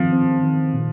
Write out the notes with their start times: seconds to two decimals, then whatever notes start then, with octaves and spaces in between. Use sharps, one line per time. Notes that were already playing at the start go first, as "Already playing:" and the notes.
Already playing: D#3 F3 C4
0.12 C4
0.43 D#3
0.74 A#2